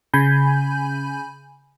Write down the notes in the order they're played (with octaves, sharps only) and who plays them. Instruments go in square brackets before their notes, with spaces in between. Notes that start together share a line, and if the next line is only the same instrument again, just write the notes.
[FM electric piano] C#3 G#5 B5 G6